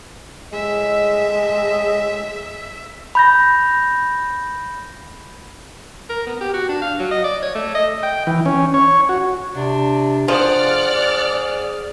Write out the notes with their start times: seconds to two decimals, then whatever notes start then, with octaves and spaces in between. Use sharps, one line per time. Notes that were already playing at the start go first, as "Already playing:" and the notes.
0.53 A2 G#3 D#5 E5
3.15 B5 G6 A#6
6.09 A#4
6.27 B3
6.41 G4
6.54 F#4
6.68 D4
6.82 F5
6.99 F#3
7.11 D#5
7.24 D5
7.43 C#5
7.55 A3
7.75 D#5
8.03 G5
8.27 E3
8.46 C#4
8.74 C#5
9.09 F#4
9.55 C3 D4
10.28 F3 G#4 D5 F#5 F6